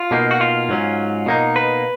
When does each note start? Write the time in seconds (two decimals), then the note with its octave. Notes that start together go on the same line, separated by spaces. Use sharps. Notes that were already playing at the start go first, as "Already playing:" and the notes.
Already playing: F4
0.11 B2 A#3 D#4
0.31 F#4
0.41 F4
0.69 G#2 F#3 C#4
1.26 B2 A#3 D#4
1.56 B4